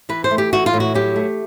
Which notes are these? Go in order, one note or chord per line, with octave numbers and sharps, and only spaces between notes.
E3 B4
C5
A3
G4
E3 F#4
F4
A2
F#4
F#3 G4
A3